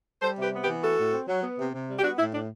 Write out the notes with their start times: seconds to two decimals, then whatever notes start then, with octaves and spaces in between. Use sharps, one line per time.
0.22 G3 A4 C5
0.38 C3 G4 B4
0.53 B3
0.63 G4 B4
0.68 E3
0.83 A3 F#4 A4
0.98 A2
1.13 C4
1.28 F#3
1.43 B3
1.59 C3
1.73 C3
1.88 G3
1.99 G4
2.03 B3 D4 F#4
2.19 A2 E4
2.33 A2 D4